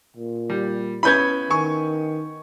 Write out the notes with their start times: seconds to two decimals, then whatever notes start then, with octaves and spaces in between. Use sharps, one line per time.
0.17 A#2
0.50 G3
1.03 B3 C#4 E4 B5 G6 G#6
1.50 D#3 G#5 C#6